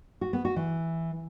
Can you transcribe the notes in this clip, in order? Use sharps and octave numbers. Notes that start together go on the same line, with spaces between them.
F#4
B3
F#4
E3